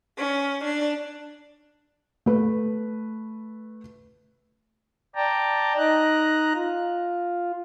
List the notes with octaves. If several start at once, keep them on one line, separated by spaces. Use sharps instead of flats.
C#4
D4
A3 B4
D5 G5 A5 A#5
D#4 D#5 A#5 F#6
F4